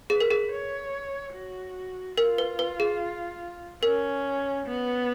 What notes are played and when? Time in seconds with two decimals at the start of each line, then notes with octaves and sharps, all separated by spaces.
0.10 G#4 B4
0.20 A#4
0.31 G#4
0.52 C#5
1.34 F#4
2.17 F4 A#4
2.38 B4
2.59 B4
2.80 G#4
3.83 C#4 A#4
4.66 B3